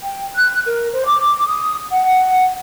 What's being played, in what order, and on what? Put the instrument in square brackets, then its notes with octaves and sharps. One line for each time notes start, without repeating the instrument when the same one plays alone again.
[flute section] G5
F#6
A#4
C5
D6
D#6
F#5